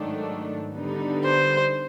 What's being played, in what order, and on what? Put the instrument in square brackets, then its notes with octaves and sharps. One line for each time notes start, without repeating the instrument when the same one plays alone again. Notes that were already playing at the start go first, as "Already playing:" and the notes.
Already playing: [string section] G#2 D#3 F#3 A3 D4
D3 G3 B3 D#4
[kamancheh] C5